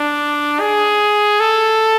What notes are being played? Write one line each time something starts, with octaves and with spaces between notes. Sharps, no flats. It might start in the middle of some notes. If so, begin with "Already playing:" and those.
Already playing: D4
G#4
A4